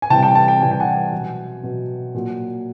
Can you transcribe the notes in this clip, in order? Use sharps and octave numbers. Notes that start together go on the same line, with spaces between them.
G#5
C3 E3 G3 G5 A5
G5 A5
G5 A5
G5 A5
C3 E3 G3 G#5
G5
F#5 G#5
B2 F#3
B2 F#3
A#2 F#3